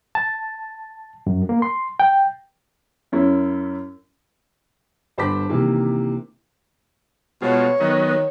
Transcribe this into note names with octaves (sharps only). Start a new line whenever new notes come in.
A5
F#2
A#3
C6
G5
F#2 C#4 E4
G1 C5 A5 B5 D6 B6
C3 D#3 E3 A#3
B2 G#3 F4 C#5
D#3 F#3 B3 D#5